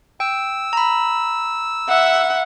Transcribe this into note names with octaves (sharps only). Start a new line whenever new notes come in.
G5 E6
A#5 B5
E5 F#5